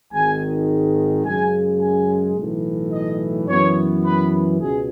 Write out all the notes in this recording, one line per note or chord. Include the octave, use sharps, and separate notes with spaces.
G#1 G#2 D#3 G#5
F#2 C#3 G#3 G#5
G#5
B1 A2 E3
D#5
F#2 E3 B3 C#5
B4
C#2 B2 G#4